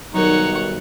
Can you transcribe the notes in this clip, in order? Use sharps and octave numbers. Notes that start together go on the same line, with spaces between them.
B1 D#3 F#3 G3 D#4 A#4 C#5 F#5